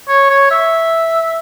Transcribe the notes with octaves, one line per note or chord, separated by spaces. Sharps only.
C#5
C#5
E5